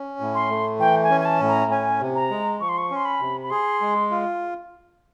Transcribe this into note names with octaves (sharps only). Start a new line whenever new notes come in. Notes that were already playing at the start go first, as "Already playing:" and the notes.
Already playing: C#4
A2
C6
A3
E3 G5
G#5
C#4
G#5
A5
A2
A#5
C#4 G#5
C3
A#5
G#3
F3 C#6
C6
C#6
C#4
C6
B5
C3
B5
G#4 C6
G#3
F4